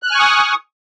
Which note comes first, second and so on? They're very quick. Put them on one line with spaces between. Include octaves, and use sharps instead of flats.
F#6 F6 G#5 C#6 D#6